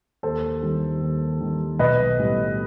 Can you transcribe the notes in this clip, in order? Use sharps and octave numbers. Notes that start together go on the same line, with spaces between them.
D#2 A4 C5
D#3 G3
D#2
D#3 G3
B1 B4 D#5
A2 G3 B3